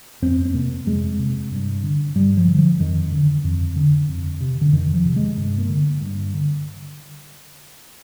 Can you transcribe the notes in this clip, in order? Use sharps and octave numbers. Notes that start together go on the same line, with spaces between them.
F2 C4
C4
C3 A#3
F2 G#3
C3
G2
D3
G2 G3
F3
D3
F3
F2 D#3
D3
F2
D3
F2
C3
D3
F2 D#3
F3
C3
G#3
G2
A#3
D3
G2
D3